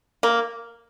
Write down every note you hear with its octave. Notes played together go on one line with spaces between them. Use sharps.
A#3